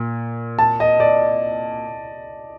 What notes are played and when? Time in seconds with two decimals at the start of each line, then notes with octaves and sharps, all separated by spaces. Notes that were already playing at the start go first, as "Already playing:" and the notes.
Already playing: A#2
0.59 A5
0.80 D#5
1.00 D5